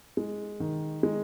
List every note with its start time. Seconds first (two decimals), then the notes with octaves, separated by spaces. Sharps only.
0.17 G#3
0.60 D#3
1.03 G#3